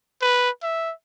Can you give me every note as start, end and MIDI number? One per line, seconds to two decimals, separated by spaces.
0.22 0.50 71
0.63 0.92 76